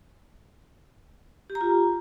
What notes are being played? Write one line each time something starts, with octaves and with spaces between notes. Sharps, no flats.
G4
A#5
F4